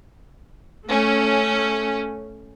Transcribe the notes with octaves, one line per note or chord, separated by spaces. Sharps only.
A3 C#4